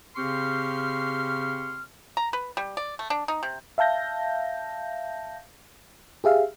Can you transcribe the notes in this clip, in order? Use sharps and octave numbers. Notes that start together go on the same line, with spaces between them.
C#3 C4 G4 C6 C#6 F6
A#5
B4
G3
D5
A3
D4
D#4
C3
E5 F5 A5 G6 A#6
G4 G#4 E5 F5